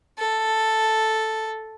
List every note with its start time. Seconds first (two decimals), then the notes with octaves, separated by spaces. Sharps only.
0.18 A4